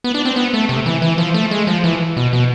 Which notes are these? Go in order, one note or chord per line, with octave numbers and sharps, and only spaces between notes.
B3
D4
C4
B3
A3
C3
E3
E3
F3
A3
G#3
F3
E3
B2
B2